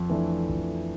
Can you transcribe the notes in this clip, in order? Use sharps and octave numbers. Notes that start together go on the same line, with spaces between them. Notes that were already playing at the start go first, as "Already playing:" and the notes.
Already playing: F2
E3 A3 D4
F2